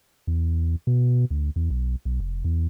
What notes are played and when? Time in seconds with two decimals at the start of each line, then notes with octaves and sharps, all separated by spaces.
0.27 E2
0.87 B2
1.31 D2
1.56 E2
1.70 B1
2.05 B1
2.20 F1
2.45 E2